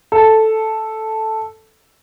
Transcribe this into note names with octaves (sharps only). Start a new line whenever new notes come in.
A4